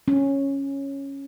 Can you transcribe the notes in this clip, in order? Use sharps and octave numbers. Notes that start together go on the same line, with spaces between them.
C#4